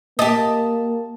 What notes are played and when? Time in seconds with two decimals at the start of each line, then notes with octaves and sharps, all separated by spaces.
0.19 A#3 G4 D#5 A5